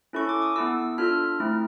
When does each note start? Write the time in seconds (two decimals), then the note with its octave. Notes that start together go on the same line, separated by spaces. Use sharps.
0.13 C#4 E4 A4 C#6
0.29 D6
0.42 D#6
0.56 B3 E4 A4 E6
0.98 D4 F4 A4 F6
1.40 A3 C4 E4